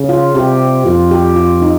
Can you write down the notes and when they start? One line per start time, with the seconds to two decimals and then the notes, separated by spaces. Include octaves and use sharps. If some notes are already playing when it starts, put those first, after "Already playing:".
Already playing: C#3
0.09 F4
0.35 C3 G4
0.86 F2 F4
1.11 G4
1.36 F4
1.62 D#4